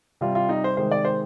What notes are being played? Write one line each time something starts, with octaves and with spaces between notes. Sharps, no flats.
C3 G3 F4
F4
D#4
C5
C3 D#3 G#3 C5
D5
C5